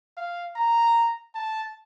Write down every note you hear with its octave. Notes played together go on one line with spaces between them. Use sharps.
F5
A#5
A5